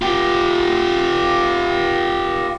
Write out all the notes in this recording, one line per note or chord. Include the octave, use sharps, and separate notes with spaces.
F4 G4